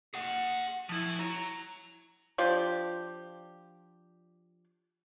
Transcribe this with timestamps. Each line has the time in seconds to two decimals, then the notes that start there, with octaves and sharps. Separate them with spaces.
0.14 G#4 F#5
0.89 F3 E4
1.19 C#5 A#5
2.38 F3 D4 G4